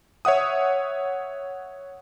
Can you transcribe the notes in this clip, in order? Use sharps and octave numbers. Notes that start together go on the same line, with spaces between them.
C#5 E5 F#5 D#6